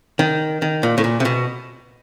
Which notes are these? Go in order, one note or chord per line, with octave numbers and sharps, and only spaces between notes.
D#3
D#3
A#2
A2
A#2
C3
B2